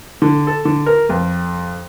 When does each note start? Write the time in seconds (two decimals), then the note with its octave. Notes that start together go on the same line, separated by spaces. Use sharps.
0.22 D3
0.47 A4
0.65 D3
0.86 A#4
1.09 F2